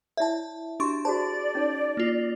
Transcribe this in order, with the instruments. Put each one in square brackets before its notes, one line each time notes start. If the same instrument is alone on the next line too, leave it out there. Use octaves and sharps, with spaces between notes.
[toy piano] E4 C#5 D5 [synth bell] E5 A5
[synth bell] D4 C6 C#6 [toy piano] F#4 G4 E5
[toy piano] F#4 G#4 C5 [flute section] D5 [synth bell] A5
[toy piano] C#4 D#4 C#5
[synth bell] A#3 F4